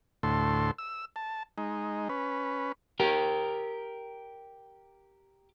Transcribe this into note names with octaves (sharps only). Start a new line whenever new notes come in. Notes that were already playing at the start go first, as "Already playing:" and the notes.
D2 A2 A4 C6
E6
A5
G#3 D#4
C#4 B4
G4 A#4